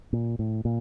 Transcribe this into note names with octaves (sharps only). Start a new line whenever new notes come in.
A#2
A2
A#2